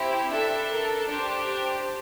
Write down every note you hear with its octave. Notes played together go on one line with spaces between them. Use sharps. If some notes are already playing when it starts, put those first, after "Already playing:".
Already playing: C4 E4 G4
D4 A4 E5
A#4
D4 G4 C5